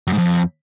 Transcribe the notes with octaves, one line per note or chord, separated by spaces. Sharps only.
F#2
G#2
F2